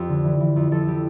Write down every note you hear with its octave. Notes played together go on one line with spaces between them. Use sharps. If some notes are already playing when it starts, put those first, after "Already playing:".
Already playing: F2 F3 F4 G4
D3
E3
E3
F2
F2 A4
E3 G4